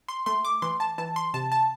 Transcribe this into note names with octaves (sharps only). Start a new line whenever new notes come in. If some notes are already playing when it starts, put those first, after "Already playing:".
C6
A3 C6
D6
E3 C6
A5
E3 A5
C6
C3 A5
A5